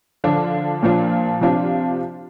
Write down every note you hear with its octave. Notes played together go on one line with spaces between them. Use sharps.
D3 F3 D4 F4
A#2 F3 D4 F4
C3 F3 D4 F4